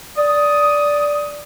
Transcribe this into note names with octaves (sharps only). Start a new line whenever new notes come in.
D5 D#6